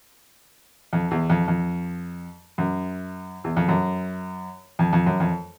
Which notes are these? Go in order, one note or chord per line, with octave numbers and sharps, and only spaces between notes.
F2
E2
F2
F2
F#2
E2
F2
F#2
F2
F2
F#2
F2